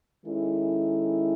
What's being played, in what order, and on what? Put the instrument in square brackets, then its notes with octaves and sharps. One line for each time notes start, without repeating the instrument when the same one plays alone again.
[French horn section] D#3 G#3 C#4 E4 A4